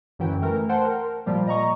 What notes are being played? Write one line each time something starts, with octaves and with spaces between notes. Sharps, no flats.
F#2 D3 E3 G5
E3 A3 A#4
C5 F#5 G5 A5 C6
A#4
A#2 F3 G3 A#3
D#5 A#5 C#6